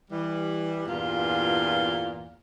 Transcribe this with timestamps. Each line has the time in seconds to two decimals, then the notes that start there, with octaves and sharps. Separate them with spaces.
0.10 E3 G3
0.86 E2 G2 A#2 F4